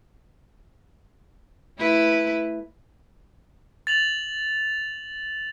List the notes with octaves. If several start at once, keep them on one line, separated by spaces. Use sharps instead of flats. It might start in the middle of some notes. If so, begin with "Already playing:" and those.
A3 E4 B4
A6 F7 F#7